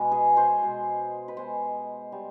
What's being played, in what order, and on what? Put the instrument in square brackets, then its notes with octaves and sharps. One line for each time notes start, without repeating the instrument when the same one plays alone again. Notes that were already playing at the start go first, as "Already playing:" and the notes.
Already playing: [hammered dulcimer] B2 G#3 B4
G#4
C5
B2 G#3
B4
B2 G#3 C5
G3